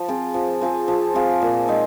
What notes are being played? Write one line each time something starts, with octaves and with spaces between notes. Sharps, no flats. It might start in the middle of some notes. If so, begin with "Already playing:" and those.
Already playing: F3
C4 F4 G#4
F3
C4 F4 G#4
F3
C4 F4 G#4
A#2
G#3 C4 D#4